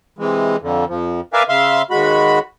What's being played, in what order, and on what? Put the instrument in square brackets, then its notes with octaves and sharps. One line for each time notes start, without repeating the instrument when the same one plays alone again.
[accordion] C3 E3 G#3
F2 D3
F2 F3
A#4 B4 D5 E5 F5 G#5
C#3 E5 F5 C6
D#2 G#3 F#4 B5